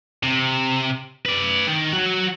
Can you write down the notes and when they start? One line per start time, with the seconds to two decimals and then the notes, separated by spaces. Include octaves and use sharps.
0.23 C3
1.26 B4 D5
1.67 D#3
1.92 F#3 F#4